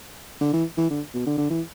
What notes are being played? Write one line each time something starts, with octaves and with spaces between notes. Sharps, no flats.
D3
E3
E3
D3
B2
D3
D3
E3